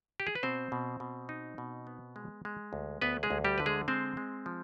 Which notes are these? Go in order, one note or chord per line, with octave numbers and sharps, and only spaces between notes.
G4
G#4
B4
B2 C4 C5
B2
B2
D#4
B2
B3
G#3
G#3
D2
D2 B3 B4
G#3 G#4
D2
G3 G4
D3 B4
G#3 G#4
G#3 C4 C5
G#3
F3